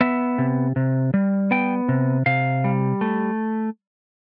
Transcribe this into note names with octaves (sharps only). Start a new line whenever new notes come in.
B3 E5
C3
C3
G3
B3 G5
C3
C3 F5
G3
A3